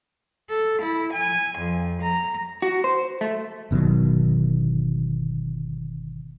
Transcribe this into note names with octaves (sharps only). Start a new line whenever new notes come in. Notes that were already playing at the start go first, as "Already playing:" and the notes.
A4
E4
G#5
F2
A#5
F#4
C5
A3
G1 B2 D#3 F#3